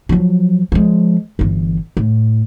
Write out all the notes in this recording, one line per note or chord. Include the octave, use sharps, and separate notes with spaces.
F3 F#3
F3 G#3
G1 E3
A2